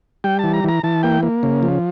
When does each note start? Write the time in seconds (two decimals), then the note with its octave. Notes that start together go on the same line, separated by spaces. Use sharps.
0.24 G3 G5
0.39 E3 A5
0.54 A#5
0.64 E3 A#5
0.83 E3 A5
1.03 A#3 G5
1.23 A#3
1.43 C#3
1.63 F3